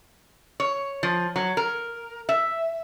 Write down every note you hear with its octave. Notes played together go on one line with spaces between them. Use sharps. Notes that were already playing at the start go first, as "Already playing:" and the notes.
C#5
F3
F#3
A#4
E5